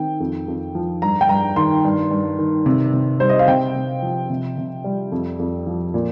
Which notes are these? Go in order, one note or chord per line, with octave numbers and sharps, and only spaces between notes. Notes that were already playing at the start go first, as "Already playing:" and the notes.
Already playing: D#3 C4 G5
F2
F2
F3
G2 A#5
G5
G2 A#5
D#3 C6
G2
G2
D#3
C3
C3
G3 C5
D#5
F5
C3 G5
C3
F3
C3
C3
G3
F2
F2
F3
A#2